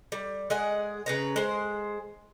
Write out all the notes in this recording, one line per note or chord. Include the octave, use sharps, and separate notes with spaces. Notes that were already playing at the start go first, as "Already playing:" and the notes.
G3
G#3 G#4 F#5
C#3 B4 A#5
G#3 C5